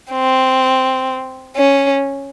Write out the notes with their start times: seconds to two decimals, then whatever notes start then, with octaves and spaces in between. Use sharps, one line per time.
0.12 C4
1.57 C#4